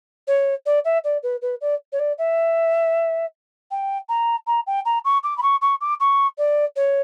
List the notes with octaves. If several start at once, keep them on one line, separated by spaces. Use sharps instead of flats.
C#5
D5
E5
D5
B4
B4
D5
C#5
D5
E5
G5
A#5
A#5
G5
A#5
C#6
D6
B5
C#6
C#6
D6
C#6
D5
C#5